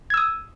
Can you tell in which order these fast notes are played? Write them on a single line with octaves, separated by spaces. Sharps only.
G#6 E6 D#6